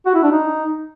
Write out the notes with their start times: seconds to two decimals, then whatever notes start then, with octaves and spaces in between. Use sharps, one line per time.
0.06 F#4
0.14 E4
0.23 D4
0.32 D#4